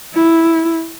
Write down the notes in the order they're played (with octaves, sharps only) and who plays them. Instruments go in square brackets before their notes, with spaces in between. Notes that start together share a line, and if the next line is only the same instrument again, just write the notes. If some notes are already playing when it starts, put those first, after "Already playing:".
[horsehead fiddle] E4